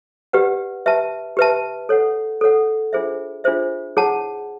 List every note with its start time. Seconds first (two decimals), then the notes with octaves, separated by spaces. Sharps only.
0.33 G4 B4 D5 F#5
0.86 G4 B4 E5 A5
1.37 G4 B4 E5 A5
1.89 A4 C#5 F#5
2.41 A4 C#5 F#5
2.93 D4 F4 G#4 C5 E5
3.44 D4 F4 G#4 C5 E5
3.97 E4 G#4 C#5 F#5 A5